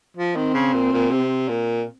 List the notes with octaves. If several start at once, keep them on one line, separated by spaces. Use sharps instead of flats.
F3
D#3 C4
C#3
A#2
A#2
C3
A#2